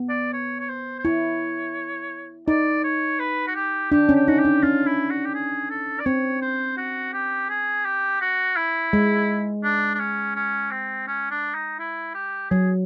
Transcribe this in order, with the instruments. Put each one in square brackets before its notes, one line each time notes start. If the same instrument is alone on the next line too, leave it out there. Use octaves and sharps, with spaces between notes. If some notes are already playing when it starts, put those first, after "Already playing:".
Already playing: [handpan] B3
[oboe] D5
C#5
C#5
C5
C5
[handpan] E4 [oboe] C#5
[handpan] D#4 [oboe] D5
[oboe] C#5
B4
F#4
G4
[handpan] D4 [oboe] G4
[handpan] C#4
[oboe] G4
[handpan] D#4 [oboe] F#4
[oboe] G4
[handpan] D4
[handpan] C#4 [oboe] F4
[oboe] E4
F#4
G4
G#4
A4
D5
[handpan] C4 [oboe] C#5
[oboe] C5
F#4
G4
G#4
G4
F#4
E4
[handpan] G#3
[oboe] D4
D4
C#4
C#4
C4
C#4
D4
D#4
E4
G4
[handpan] F#3 [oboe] G#4